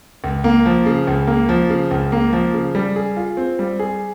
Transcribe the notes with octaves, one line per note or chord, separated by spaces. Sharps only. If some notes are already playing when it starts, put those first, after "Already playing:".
C#2
A#3
F3
C#3
C#2
A#3
F3
C#3
C#2
A#3
F3
C#3
G3
G#4
F4
C4
G3
G#4